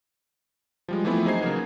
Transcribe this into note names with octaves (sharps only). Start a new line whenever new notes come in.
F3 G3 G#3
E3 F3 A3 B3 C4 E4
F#3 D#4 G#4 C5 G#6 C7
C#3 F#3 A#3 B3